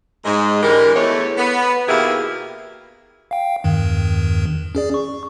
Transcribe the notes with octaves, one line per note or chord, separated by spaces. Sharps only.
G#2 G#3
D3 E3 G#3 G4 A#4
E2 A3 C#5
B3
B2 D#3 A#3 E4 G4 G#4
F5 G5
E2 G2 D#3
C#4 G#4 D5
C#6